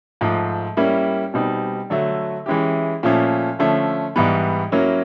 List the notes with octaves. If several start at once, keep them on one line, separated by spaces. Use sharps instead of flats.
G#2 F3 A3
G3 A#3 C#4 E4
B2 G3 C4 D#4
D3 F#3 A3
E3 G#3 C#4 E4 G4
A#2 F3 A3 C#4
D3 F3 A3 C#4
G#2 E3 G3 B3
F#3 A#3 C#4 E4